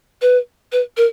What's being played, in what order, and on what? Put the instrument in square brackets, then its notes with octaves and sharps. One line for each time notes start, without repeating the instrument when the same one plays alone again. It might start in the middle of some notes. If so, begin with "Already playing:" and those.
[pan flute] B4
B4
A#4